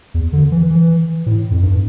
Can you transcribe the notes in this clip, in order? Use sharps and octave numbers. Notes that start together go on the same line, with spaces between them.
E2
D3
E3
E3
A2
F2
G2